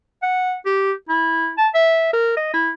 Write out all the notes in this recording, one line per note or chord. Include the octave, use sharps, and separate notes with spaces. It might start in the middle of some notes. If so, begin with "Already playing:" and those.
F#5
G4
E4
A5
E5
A#4
D#5
E4